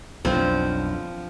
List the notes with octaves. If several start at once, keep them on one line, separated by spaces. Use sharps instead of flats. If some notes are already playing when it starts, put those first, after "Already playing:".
B1 F2 F3 C4 D4